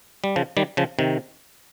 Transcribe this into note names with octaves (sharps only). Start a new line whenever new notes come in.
G3
C#3 F3
D#3 G3
C#3 F3
C3 D#3